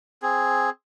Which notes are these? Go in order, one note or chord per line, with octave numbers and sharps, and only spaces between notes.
C4 G#4